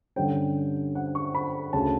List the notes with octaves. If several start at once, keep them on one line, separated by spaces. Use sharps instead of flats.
G2 D3 G3 C#4 G5
F#5
C#6
B5
D2 C#3 A5